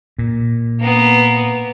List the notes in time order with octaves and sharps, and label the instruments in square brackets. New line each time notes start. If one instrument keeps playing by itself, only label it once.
[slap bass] A#2
[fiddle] A#3 B3